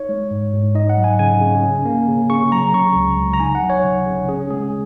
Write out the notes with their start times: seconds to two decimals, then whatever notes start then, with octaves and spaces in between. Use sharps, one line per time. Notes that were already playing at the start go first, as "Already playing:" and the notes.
Already playing: D#4 C#5
0.09 G#3
0.31 G#2
0.53 G#2
0.75 D#4 D#5
0.90 F#5
0.97 F#3
1.04 G#5
1.19 C#3 G#5
1.41 C#3
1.63 C#4
1.85 A#3
2.08 C#3
2.30 C#3 C#6
2.52 F#3 A#5
2.74 C#3 C#6
2.96 C#2
3.18 C#2
3.34 A#5
3.40 D#4 G#5
3.55 F#5
3.63 F#3
3.70 C#5
3.84 C#3
4.06 C#3
4.28 C#4 G#4
4.50 G#3 G#4